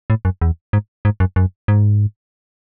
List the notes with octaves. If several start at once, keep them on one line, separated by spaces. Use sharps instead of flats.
A2
F#2
E2
G#2
G#2
F#2
F#2
G#2